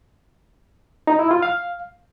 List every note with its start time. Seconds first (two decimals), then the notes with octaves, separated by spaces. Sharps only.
1.07 D#4
1.19 E4
1.31 F4
1.42 F5